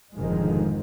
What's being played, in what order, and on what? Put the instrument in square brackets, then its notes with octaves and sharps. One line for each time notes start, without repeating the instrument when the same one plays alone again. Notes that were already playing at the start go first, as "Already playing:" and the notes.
[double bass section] F1 G#2 D3 D#3 F3 G#3